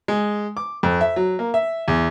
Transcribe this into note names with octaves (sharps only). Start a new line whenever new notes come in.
G#3
D6
F2
E5
F#3
A#3
E5
E2